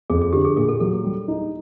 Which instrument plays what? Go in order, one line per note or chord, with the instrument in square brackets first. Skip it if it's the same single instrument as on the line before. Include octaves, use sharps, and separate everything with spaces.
[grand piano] F2 [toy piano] G#4
[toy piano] G#4
[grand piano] D3 [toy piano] G4
[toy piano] G#4
[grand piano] A#2 [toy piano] G#4
[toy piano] A4
[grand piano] F#3 [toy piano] A4
[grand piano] G3
D#4